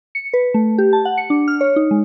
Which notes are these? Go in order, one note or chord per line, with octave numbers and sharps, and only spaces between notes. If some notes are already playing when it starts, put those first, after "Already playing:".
C#7
B4
A3
G4
A5
F#5
C#7
D4
F6
C#5
D#4
G#3